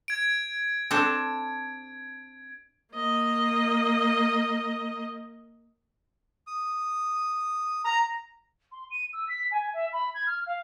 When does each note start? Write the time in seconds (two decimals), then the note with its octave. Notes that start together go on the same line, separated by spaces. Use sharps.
0.08 G#6 D7
0.91 C4 D4 A4
2.94 A#3 D#5
6.47 D#6
7.85 A#5
8.71 C6
8.90 D#7
9.13 E6
9.28 B6
9.51 G#5
9.73 E5
9.92 B5
10.14 G#6
10.26 F6
10.46 F5